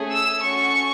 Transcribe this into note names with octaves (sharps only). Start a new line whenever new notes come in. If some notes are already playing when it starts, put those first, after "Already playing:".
Already playing: A3 C#4 G#4
E6
C#4 F#4 A4 C#6